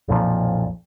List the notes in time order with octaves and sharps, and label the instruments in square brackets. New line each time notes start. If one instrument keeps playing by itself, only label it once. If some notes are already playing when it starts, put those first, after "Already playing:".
[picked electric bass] B1 F2 A#2 F3